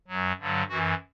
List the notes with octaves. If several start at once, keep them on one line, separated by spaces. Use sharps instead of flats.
F#2 F#3
G2 D3 F#3
F#2 E3 F#4